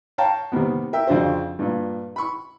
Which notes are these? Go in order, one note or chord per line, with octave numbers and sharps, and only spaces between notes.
C#5 F5 G5 A5 A#5
C3 D#3 G3 A#3 B3
A#4 E5 G5
F2 C#3 D4 F#4 C5
G2 A#2
B5 C#6